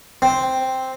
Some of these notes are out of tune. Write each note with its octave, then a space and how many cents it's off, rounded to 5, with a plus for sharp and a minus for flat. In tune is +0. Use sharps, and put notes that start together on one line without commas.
C4 +0